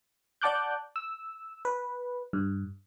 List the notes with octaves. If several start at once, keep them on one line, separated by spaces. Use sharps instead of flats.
D5 F#5 A5 D6 F#6 G6
E6
B4
G2